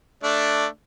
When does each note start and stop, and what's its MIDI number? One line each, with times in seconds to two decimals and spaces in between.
0.23 0.66 57
0.23 0.66 62
0.23 0.66 74